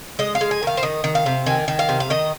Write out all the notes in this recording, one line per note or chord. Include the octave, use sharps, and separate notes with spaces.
G#3 D#5
F5
G#3
G#5
D#3 F5
C5
D#3 D#5
D#3
F5
C3
D#3 G#5
D#3
F5
C3
F5
D#3 D#5